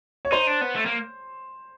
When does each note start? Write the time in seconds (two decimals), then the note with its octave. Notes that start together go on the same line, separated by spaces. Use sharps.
0.25 C#5
0.32 D#4 C5
0.47 D4
0.61 B3
0.76 A3
0.86 A#3